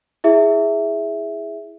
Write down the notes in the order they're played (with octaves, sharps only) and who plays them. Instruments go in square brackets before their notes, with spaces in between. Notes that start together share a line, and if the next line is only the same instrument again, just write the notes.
[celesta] E4 G#4 E5